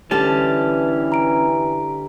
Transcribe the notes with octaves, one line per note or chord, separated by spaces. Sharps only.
D3 E3 G3 C#4 G4 A5
A#5 D7